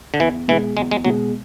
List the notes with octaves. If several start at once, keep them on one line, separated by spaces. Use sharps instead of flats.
D3
E2 E3
B2 E3 G#3
E2 G#3
G#3
B2 F#3 G#3